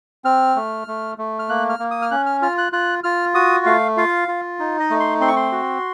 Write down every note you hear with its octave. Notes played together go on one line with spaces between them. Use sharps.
C4 F6
A3
A3
A3
F6
A#3 F#6
F6
A#3
D#6
F6
C#4 F#6
F6
F4 F6
F#6
F4 F#6
F4 F6
F#4 D#6
A3 F5
F4 F5
F4
D#4
D#5
A3
C6
C4 C6
C#6
C6
F#4